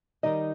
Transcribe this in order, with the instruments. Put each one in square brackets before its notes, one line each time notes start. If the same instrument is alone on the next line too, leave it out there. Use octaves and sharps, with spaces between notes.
[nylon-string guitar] D#3 G3 D#4 D#5